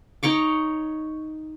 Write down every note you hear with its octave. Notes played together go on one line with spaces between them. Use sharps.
D#4 C#5 C#6 D6